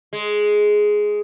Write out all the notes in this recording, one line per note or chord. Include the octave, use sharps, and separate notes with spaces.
G#3